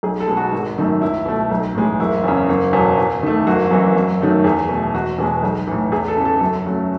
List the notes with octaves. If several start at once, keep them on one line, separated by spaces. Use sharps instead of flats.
B1 G#4
A4
B2 G#3
F#4
G#1
F#2 D#3 A3
C#2 E4
B2 A3
B1
A2 E3 G#3
F#1 E4
E2 C#3
F#1
E2 B2 F#3
E2
D#3 A3
F#1 F#4
F#2 E3
F#2
D#3 F#3 A3
E2 G#4
B2 A3
E1 F#4
E2 B2 G#3
B1
A2 E3
E2 G#4
A4
C#3 E3
A4
F#2
C#3 F#3 A3